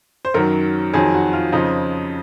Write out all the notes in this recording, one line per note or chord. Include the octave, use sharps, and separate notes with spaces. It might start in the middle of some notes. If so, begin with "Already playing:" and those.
C5
F#2 D#3 F#3 A#4
F2 D#3 F#3 G#4
F#4
F4
F2 C#3 F3 D#4